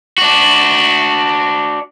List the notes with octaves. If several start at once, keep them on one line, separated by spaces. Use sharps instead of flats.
D4 F#4